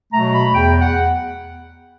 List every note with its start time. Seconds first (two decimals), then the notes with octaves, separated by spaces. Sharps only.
0.12 B2 F#3 A3 A#5
0.32 B5
0.53 E2 G5
0.81 F#5